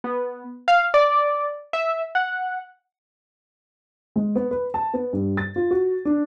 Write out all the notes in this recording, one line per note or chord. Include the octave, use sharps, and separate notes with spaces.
B3
F5
D5
E5
F#5
G#3
B3
B4
A5
B3
G2
A6
F4
F#4
D4